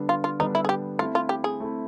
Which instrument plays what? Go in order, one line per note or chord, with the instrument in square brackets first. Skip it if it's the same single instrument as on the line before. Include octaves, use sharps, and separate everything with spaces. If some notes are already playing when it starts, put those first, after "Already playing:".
Already playing: [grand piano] D3 G3 B3 D4
[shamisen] F4
F4
[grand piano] D3 G3 B3 D4 [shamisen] D#4
[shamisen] E4
G#4
G4
[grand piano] A3 C4 E4 [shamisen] F4
[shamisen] F4
G4
G#4
[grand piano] A3 C4 E4